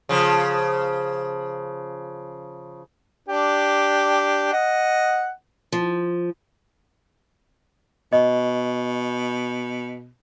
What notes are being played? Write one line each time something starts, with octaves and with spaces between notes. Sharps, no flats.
C#3 F3
D4 G4
D#5 F#5
F3
B2 D#5